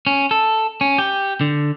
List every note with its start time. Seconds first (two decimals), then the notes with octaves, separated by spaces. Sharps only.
0.07 C#4
0.31 A4
0.81 C#4
0.98 G4
1.41 D3